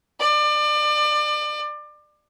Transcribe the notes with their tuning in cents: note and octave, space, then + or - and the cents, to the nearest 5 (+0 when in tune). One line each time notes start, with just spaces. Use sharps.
D5 +30